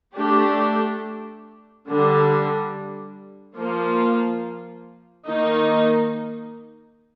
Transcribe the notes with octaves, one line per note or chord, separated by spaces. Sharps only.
A3 D4 G4
D3 G3 D4
F3 A#3 F4
D#3 A#3 D#4